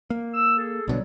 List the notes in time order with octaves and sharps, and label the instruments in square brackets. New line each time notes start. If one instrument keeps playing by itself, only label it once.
[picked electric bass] A#3
[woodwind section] E6
G#4 A4
[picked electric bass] B1 B2 D3 [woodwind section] F#3 G3